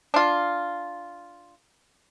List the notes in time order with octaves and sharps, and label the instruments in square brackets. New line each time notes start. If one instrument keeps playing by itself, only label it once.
[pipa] D4 F4